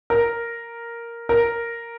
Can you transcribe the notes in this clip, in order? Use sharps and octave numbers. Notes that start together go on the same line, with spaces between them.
A#4
A#4